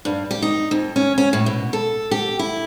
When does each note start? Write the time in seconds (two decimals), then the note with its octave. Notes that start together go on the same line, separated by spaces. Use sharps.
0.05 G2
0.31 G4
0.42 D#4
0.71 F2
0.96 C#4
1.18 C#4
1.33 A2
1.46 B2
1.73 A4
2.11 G4
2.39 E4